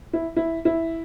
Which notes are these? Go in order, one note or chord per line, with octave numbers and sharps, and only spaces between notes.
E4
E4
E4